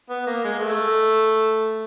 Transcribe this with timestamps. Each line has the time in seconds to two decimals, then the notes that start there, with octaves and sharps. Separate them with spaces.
0.10 B3
0.27 A#3
0.44 G#3
0.60 A3